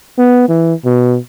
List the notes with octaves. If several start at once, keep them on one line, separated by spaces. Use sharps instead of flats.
B3
E3
B2